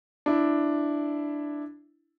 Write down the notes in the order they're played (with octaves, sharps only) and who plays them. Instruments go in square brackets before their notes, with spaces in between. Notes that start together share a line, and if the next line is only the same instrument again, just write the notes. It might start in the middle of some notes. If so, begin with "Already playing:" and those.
[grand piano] D4 E4